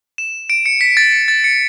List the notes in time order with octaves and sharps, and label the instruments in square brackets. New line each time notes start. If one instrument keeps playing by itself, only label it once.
[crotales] E7
D7
C#7
B6
A6
C#7
A6
C#7